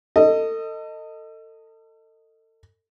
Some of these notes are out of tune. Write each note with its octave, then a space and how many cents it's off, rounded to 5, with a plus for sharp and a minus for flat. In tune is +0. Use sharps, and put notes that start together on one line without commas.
A4 +35 D#5 +0